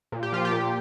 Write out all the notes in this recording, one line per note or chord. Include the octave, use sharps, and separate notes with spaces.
A#2
G4
F3 F4
G4
A#2